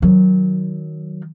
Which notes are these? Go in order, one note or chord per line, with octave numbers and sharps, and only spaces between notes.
D#3 F#3